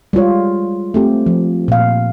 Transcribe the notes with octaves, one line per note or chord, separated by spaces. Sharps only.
G3 G#3 F4 C#5
A3 C4 G4
F3
A#2 F5